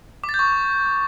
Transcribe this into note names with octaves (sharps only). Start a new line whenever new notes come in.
D6
A6
G6
C#6